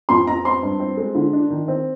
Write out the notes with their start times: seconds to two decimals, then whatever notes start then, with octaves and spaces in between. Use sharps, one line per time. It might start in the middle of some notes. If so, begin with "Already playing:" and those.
0.09 F2 C6
0.27 F2 A#5
0.44 C4 C6
0.62 G2
0.80 C4
0.97 G#3
1.15 D3
1.33 D4
1.50 D#3
1.68 C4